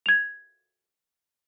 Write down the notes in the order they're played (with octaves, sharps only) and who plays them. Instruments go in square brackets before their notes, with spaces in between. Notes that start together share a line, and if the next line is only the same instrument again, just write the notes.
[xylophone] G#6 F7